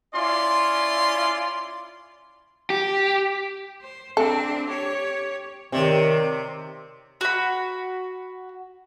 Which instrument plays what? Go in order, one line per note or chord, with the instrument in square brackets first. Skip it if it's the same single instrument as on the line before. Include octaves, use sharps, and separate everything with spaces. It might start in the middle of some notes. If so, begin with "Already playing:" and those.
[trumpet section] C#4 E4 F4 D5 C6
[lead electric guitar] G4
[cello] C5
[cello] C4 D4 [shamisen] A4
[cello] G4 C#5
[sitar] C3 [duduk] D#3 [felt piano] C4 C#5 D5
[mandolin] F#4 B5